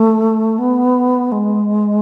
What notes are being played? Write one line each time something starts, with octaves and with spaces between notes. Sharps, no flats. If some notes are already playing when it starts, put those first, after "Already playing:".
Already playing: A3
B3
G#3